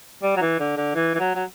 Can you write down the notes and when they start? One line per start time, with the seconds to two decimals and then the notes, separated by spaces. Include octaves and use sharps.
0.23 G3
0.36 F#3
0.41 E3
0.60 D3
0.77 D3
0.95 E3
1.15 E3
1.19 F#3
1.35 F#3